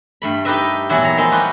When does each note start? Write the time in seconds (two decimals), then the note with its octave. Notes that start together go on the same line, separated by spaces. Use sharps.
0.22 G2 A3 B5
0.45 D#4 G4 A4 B4 D#5 E5
0.89 E2 A#2 F#3 E4 F#5
1.05 A#5
1.17 F3 G#3 A#3 D#4 E4
1.31 G3 F#4 G4 B4